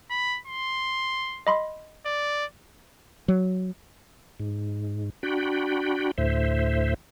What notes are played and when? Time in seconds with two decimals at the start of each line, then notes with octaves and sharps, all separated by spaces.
0.11 B5
0.47 C6
1.47 D#5 B5 C6
2.06 D5
3.28 F#3
4.40 G#2
5.23 D4 F#4 G5 B5
6.18 D2 A2 C5 E5